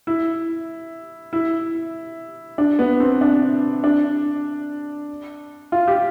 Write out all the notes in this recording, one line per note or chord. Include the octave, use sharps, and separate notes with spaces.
E4
E4
D4
B3
C4
D4
D4
F4
G4